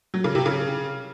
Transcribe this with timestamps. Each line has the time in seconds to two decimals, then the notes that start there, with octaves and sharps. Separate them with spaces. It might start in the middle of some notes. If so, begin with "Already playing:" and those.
0.14 F#3
0.24 C#3
0.35 C3
0.46 C#3